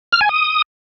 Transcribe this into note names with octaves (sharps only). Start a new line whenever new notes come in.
F6
G#5
D#6